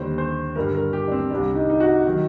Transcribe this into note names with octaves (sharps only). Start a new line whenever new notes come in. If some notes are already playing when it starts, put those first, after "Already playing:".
Already playing: D#2 D3 G3 C5
C5
G2 D3 G3 A#4
A#4
G4
D4
C4
C2 C3 G3 D4
D#4
D#4
F#4
D#3 F#3